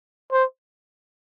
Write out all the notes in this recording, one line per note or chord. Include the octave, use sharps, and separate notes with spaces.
C5